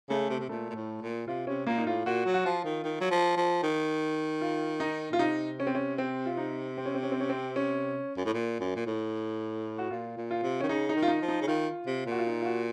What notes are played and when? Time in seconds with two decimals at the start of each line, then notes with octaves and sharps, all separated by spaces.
0.10 C#3 A3
0.30 C3
0.40 C3
0.49 A#2 A3
0.70 A#2
0.75 A2
1.02 A#2
1.27 C3 F4
1.47 C3 C#4
1.67 A#2 A#3
1.78 D#4
1.86 A2 F4
2.06 A#2 F#4
2.26 F#3
2.34 F#4
2.45 F3 F4
2.65 D#3
2.84 D#3
3.01 F#3
3.11 F3
3.37 F3
3.63 D#3
4.41 F4
4.80 D#4
5.11 A#2 F4
5.19 C3 D#4
5.60 C#4
5.67 C4
5.75 C#4
5.98 C4
6.26 F4
6.37 D#4
6.77 C4
6.86 C#4
6.95 C4
7.03 C#4
7.12 C4
7.20 C#4
7.29 C4
7.56 C#4
8.17 F#2
8.26 A2
8.34 A#2
8.60 F#2
8.76 A#2
8.86 A2
9.78 F#4
9.91 A#2 F4
10.17 A#2
10.31 F4
10.43 C3
10.60 D#3 C#4
10.69 C#3 D#4
10.89 D#4
10.96 D#3
11.02 F4
11.08 D#4
11.22 F3
11.28 D#4
11.41 C#3
11.48 D#3 F4
11.87 C3
12.06 A#2
12.11 F#4
12.18 F4
12.27 D#4
12.41 F4
12.45 F#4